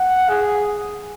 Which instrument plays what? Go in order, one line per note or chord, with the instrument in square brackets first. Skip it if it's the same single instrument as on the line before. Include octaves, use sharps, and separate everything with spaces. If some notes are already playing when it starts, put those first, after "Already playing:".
Already playing: [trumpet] F#5
G#4